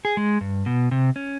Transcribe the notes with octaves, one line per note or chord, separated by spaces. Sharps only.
G#4
G#3
G2
B2
C3
C#4